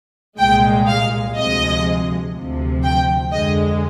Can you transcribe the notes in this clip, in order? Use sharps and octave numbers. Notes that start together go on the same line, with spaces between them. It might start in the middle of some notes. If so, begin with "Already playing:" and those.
C2 A#2 G#3 G5
F5
D2 C3 F3 G#3 D#5
D2 C3 F3
G5
F2 D3 G#3 D#5